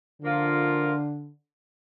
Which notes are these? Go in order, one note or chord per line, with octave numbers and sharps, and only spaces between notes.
D3 F3 A#3 F4 A#4